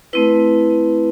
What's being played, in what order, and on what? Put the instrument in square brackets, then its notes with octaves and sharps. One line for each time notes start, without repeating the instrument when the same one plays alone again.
[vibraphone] A3 C4 E4 B4